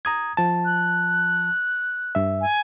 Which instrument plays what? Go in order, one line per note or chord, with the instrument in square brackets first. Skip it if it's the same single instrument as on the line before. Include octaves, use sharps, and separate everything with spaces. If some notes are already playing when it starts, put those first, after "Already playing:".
[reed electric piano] A#5 D#6 G#6
F3 A5
[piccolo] F#6
[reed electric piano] G2 E5
[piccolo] G#5